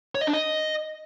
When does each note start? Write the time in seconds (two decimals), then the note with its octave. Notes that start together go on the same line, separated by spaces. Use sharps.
0.15 C#5
0.21 D#5
0.27 D4
0.33 D#5